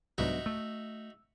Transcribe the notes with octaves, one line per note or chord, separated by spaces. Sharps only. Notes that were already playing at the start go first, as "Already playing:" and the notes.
C2 G#2 F#3 B3 D4 D#4 F#4 E5
A3 E6